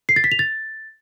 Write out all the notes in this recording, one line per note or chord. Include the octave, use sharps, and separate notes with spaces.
C7
A6
B6
F7
A6